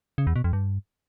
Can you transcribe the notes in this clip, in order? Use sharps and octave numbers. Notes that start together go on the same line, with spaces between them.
C#3
E2
B2
F2
G2